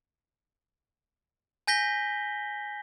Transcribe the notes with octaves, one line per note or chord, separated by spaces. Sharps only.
G#5 G6 A#6 B6 G7